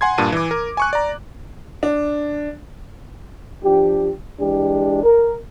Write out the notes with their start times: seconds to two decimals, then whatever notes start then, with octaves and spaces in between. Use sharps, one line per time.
0.01 F#5 G#5 C6 G#6
0.18 G2 A#2 A5 D#7
0.32 E3 D6
0.51 A#4
0.77 G#5 C#6 F#6
0.93 D5 A#5
1.83 D4
3.63 F3 D4 G4
4.40 E3 G#3 D4 G4
5.03 A#4